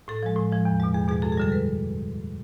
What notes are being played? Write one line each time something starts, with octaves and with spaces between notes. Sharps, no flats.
A2 A4
F3 G#3
A2
F3 G#3
E2
B2 G#3
E2 G#4
B2 G#3 G#4
F#2 A4
G#4
D3 G3 A4
B4